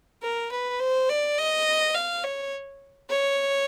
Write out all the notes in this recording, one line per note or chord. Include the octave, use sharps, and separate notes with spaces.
A#4
B4
C5
D5
D#5
F5
C#5
C#5